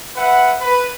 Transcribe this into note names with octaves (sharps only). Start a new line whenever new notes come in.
B4 E5 F#5
B4